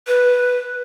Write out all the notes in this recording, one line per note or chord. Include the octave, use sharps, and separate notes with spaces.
B4